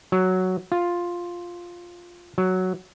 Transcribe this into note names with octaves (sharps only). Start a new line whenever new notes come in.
F#3
F4
F#3